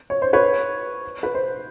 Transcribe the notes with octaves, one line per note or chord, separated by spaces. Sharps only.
C#5
C5
B4 C#5
B4
C5